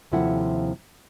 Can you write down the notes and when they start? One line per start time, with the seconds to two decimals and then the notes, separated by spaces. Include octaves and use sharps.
0.12 D#2 C3 F3 E4 A4 F#5